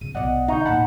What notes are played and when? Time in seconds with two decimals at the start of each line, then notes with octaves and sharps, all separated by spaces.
0.01 C#3 D#7
0.15 B1 F4 D5 D#5 F#5
0.48 D3 D#4 A#5 C#6 G6
0.65 D#2 A2 F#5 A5 B5